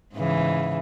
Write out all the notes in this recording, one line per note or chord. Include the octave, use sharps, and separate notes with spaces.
G#2 C#3 E3